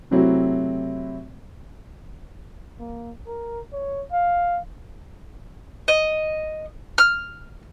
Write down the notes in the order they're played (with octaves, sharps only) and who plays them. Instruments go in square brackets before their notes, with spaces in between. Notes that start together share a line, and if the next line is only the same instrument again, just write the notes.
[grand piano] C3 F#3 A3 C4 E4 F#4
[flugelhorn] A#3
A#4
C#5
F5
[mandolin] D#5
F6